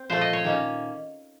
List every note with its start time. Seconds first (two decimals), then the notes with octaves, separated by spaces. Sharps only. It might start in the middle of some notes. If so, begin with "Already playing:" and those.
Already playing: C4
0.10 A#2 F3 A3 C5
0.21 D#5
0.33 C#5
0.44 D#3 A#3 C#4